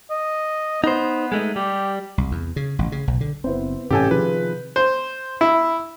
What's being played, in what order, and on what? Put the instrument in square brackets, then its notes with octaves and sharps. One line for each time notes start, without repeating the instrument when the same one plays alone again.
[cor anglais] D#5
[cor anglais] B3 [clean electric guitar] D#4 C5
[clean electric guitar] G#3 A3 D#4
[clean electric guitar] G3 [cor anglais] G4
[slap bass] C2
E2
C#3
A1
C#3
B1
D3
[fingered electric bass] F#1 C4 [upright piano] B3 E4 C5
[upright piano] A1 G6 [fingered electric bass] C3 [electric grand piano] G4 A4 G#5
[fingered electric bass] C3 D#3 F3 [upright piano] F4 G#4 [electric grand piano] B4
[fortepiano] C5
E4